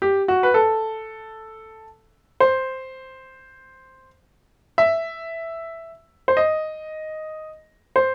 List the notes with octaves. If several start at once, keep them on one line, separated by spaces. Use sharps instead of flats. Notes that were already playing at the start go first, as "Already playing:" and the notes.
G4
F#4
B4
A4
C5
E5
C5
D#5
C5